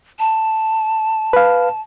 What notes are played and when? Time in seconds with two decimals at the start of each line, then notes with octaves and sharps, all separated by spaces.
0.19 A5
1.33 B4 F5